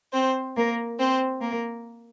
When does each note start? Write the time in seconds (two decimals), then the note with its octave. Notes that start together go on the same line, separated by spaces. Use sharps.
0.12 C4 C5
0.56 A#3 A#4
0.98 C4 C5
1.41 A#3 A#4